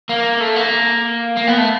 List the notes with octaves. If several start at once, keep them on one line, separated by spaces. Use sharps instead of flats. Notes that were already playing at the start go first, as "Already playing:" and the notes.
A#3
A3
A#3
A#3
B3
A3